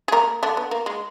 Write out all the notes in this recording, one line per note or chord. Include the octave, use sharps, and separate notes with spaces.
G#4
A#3 A#4
D3 D4
B3
A#3
G#3